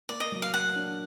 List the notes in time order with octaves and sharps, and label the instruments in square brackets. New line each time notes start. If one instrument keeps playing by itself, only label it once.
[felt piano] A#3 [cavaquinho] D5
[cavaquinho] D#5
[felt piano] F#3
[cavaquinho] F5
[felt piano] A#3 [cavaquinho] F#5
[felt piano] D4